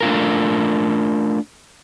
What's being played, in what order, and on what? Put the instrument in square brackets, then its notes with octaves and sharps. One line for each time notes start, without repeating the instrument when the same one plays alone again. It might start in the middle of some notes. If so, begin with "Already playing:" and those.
[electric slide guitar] A3 D4 F4 A#4